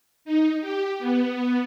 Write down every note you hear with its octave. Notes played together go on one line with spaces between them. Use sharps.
D#4
G4
B3